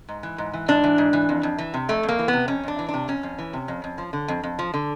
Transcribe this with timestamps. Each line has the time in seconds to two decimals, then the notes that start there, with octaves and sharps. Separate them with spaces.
0.09 G#2
0.23 E3
0.38 G#2
0.54 E3
0.68 G#2 D4
0.84 E3
0.98 G#2
1.13 E3
1.29 F2
1.43 F2
1.58 E3
1.74 C3
1.89 F2 A3
2.03 F2
2.09 A#3
2.19 E3
2.28 C3 B3
2.48 F2 C#4
2.63 F2 D4
2.79 E3
2.89 D4
2.94 C3
3.08 F2 C#4
3.23 F2
3.39 E3
3.53 C3
3.68 F2
3.84 F2
3.98 F3
4.13 D3
4.28 F2
4.43 F2
4.59 F3
4.74 D3